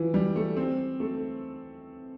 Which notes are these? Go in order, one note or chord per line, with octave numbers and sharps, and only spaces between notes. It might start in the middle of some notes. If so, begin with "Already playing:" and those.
Already playing: E3 F3
G3
A3
C4
A3